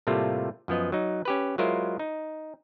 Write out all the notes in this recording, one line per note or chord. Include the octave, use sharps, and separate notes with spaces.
A2 C3 G3 A3 A#3 F4
F#2 F3 B3 D#5
F#3 D#4
C#4 G4 B4
F#3 G#3 E4 F4 A#4 C5
D#4